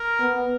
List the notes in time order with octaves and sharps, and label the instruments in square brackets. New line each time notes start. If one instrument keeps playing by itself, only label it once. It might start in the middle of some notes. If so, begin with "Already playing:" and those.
Already playing: [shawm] A#4
[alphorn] B3